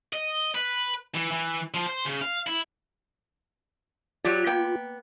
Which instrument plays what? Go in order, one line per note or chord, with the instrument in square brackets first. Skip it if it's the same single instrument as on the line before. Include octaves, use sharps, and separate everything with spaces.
[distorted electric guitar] D#5
B4
E3
E3
F3
C5
C#3
F5
E4
[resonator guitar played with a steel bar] F#3 G4 D5 [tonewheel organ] F4
[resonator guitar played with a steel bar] A#3 B3 G5